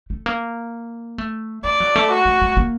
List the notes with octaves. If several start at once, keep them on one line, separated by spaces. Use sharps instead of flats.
A3
A#3
A3
A3 D5
F#3
A3
F#4
A3
A3
A#3